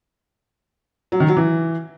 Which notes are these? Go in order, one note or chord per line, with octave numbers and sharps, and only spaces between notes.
F#3
D#3
F#3
E3